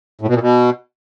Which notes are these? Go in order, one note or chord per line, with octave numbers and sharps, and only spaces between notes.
A2
B2
A#2
B2